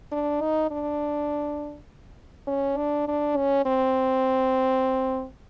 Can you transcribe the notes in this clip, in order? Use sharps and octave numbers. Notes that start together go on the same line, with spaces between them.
D4
D#4
D4
C#4
D4
D4
C#4
C4